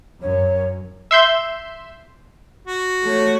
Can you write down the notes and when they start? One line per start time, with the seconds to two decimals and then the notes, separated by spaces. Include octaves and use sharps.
0.21 F#2 C#5
1.11 E5 C6 G6
2.68 F#4
3.04 A3 C#5